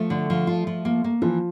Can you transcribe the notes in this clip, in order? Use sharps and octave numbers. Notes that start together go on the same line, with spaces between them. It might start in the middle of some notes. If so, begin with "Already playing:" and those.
Already playing: F3 A3
D3
F3
F4
F3
A#3
A#3
E3 F3